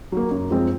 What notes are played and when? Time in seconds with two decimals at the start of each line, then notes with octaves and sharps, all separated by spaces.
0.12 F#3 A#3
0.31 F#2
0.51 F3 G#3 C4